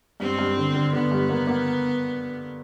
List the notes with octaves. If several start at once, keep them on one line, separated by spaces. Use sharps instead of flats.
G2 C4
G2
D3
D3
D3 B3
G2
A#3
A#3